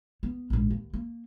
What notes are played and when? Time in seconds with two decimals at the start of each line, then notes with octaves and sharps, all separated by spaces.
0.23 B3
0.50 A#1 G#2
0.70 D#2
0.93 A#3